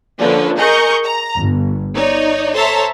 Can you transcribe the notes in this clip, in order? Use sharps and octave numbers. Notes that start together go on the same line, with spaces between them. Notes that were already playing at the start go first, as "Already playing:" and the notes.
D3 F3 A#3 C#4 D4 B4
G#4 A#4 D#5 A#5 C#6 G6
A#5
G1
D#4 C#5 D5
A4 C5 C#5 E5 A5 A#5